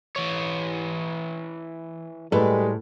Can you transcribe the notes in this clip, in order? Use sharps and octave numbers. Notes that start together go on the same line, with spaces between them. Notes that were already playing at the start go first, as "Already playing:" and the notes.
E3 C#5
A2 G3 G#3 A4 B4